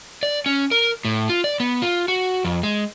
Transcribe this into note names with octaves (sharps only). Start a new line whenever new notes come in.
D5
C#4
A#4
A2
F4
D5
B3
F4
F#4
F2
G#3